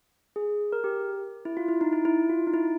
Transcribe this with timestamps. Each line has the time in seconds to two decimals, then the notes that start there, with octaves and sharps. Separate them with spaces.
0.36 G#4
0.73 A#4
0.84 G4
1.45 E4
1.57 F4
1.68 E4
1.81 D#4
1.93 E4
2.05 E4
2.29 F4
2.47 D#4
2.54 E4